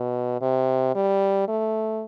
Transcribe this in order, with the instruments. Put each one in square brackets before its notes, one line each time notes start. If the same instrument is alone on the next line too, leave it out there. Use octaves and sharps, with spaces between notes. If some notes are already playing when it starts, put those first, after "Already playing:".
Already playing: [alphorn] B2
C3
G3
A3